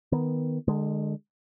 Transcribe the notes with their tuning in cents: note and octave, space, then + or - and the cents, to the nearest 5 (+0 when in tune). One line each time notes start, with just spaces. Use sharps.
D#3 +0 B3 +0
D3 +30 G#3 +0